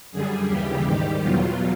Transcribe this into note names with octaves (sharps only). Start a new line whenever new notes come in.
F#2 D3 G3 G#4
D#2 C#3 E3 G3 G4
G#2 D#3 G3 G4
E2 B2 F#3 F4